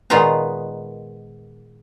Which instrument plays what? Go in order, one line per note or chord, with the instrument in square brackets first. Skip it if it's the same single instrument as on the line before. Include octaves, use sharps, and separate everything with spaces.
[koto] A#2 D#3 G#3 B3 F4 A#5